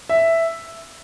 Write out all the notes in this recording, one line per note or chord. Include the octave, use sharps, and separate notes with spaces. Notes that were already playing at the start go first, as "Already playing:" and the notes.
E5